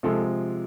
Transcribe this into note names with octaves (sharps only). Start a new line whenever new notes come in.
C3 F3 G#3 A4